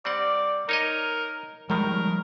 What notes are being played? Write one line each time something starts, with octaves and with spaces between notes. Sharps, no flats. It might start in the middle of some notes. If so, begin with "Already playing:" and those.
G3 C4 D5 F#5
D#4 A#4 C#5 D#5
A2 D#3 F3 G3 G#3 A#4